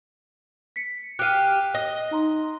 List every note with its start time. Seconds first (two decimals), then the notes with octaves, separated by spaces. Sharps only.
0.76 B6 C#7
1.19 G4 F5 F#6 D#7
1.75 D#5
2.11 D#4 A#5 C6